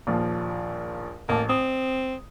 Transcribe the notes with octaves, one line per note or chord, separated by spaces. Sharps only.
A#1 D#2 F3
A1 A#3 A5
C4 D#6